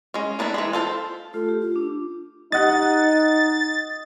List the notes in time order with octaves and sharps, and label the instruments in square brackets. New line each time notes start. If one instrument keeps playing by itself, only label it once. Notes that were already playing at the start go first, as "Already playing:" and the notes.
[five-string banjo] G#3 C#4
A#3 B3 D4 E4
E3 G#3
F4 A4 C5
[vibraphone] A3 F4 [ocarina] A4
[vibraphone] G4
[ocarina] F4
[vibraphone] D4
[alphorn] D#4 [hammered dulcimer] D#5 F#5 [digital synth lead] A6